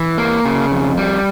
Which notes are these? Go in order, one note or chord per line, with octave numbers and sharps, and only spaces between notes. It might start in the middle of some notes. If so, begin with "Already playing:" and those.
Already playing: E3
A#3
C#3
F2
G3